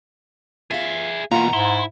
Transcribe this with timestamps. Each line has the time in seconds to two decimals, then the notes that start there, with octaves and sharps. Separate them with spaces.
0.71 F4 G#4 E5 F5
1.32 B2 E3 A#3 F4 F#5 A#5
1.53 G#2 E4 C6